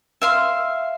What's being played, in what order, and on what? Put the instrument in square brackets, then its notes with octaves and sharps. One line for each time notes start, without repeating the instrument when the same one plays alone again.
[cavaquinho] E5 F5 C6